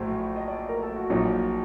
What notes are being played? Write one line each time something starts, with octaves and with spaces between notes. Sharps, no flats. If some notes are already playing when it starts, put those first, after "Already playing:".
Already playing: A#1 A2 F#3 C5
D#5
D5
A#4
A4
F#4
A#1 A#2 F#3 D#4